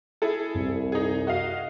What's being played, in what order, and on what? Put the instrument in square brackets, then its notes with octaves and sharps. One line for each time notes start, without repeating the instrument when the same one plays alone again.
[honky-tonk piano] E4 G#4 A4
[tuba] C2 [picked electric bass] F#2 C4
[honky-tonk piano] D#4 G#4
F#4 D#5 F5